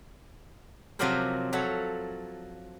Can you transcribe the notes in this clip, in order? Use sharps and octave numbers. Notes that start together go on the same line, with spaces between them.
C3 F3 F#3 G4 A#4 C5
F3 F#3 A4 C#5 E5